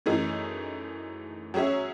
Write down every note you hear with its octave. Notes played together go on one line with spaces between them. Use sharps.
F#2 E3 A3 D#4 G#4
F#3 C#4 G#4 C#5 E5